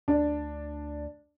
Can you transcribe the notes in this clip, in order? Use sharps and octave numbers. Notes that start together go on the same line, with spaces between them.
D2 D4